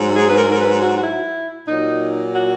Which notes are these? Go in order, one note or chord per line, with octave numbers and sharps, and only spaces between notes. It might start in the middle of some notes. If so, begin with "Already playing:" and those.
Already playing: G#2 F#3
G#4
B4
A#4
A#4
B4
F#4
F#4
E4
A#2 F#3 D#4
F#4